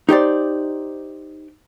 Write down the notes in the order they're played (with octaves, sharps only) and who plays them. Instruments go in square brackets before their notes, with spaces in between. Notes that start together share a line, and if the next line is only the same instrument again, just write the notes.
[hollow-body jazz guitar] D#4 G4 C5 D5